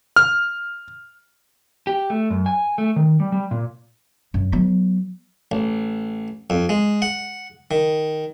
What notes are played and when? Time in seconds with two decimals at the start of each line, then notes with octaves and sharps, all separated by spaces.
0.16 F6
1.87 G4
2.10 A3
2.30 F#2
2.46 G#5
2.78 A3
2.96 D#3
3.20 G3
3.32 G3
3.51 A#2
4.34 F#2
4.52 F#3 B3
5.52 A1
6.50 F2
6.69 G#3
7.02 F#5
7.71 D#3